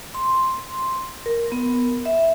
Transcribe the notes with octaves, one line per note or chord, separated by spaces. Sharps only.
C6
A#4
B3
E5